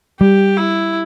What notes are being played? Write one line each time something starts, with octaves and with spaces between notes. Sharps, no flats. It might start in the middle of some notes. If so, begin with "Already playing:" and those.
G3 G4
E4